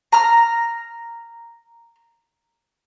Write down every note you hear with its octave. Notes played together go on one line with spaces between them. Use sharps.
A#5 F6